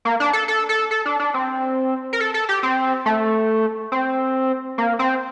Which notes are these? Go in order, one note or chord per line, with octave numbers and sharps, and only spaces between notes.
A#3
D4
A4
A4
A4
A4
D4
D4
C4
A#4
A4
A4
G4
C4
A3
C4
A#3
C4